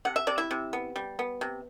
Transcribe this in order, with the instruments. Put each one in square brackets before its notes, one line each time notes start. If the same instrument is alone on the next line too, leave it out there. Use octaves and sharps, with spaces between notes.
[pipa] C3 F#5
E5
C3 D5
E4 E5
C3
B3
G3
B3
C3